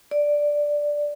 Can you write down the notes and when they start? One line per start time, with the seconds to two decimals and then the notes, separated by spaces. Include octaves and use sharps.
0.11 D5